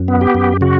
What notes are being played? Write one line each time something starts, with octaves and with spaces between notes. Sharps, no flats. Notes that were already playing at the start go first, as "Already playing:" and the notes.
Already playing: F#2
B3
G4
F#2
C#3 F#4